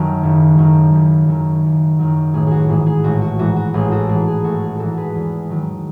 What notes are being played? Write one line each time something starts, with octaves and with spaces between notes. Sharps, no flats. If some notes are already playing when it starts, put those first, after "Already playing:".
Already playing: F#2 D#3 F#3 F#4 A4
F#1
F#2 D#3 F#3
F#1
F#2 D#3 F#3
F#1
F#2 D#3 F#3
A1 G#4
F#4 G#4
G#2 E3 G#4
G#4
A1 F#4
F#4
G#2 E3 F#4
F#4
A1 G#4
F#4 A4
G#2 E3 G#4
G#4
A1 F#4 A4
G#4
G#2 E3 F#4 A4
G#4 B4
E2
D#3 F#3